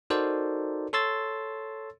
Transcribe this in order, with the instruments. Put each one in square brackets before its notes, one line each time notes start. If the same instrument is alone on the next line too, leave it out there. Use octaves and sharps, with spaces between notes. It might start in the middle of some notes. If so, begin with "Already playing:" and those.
[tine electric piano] D#4 F#4 A4 A#4 C5 D5
A4 C#5 C6 E6 A6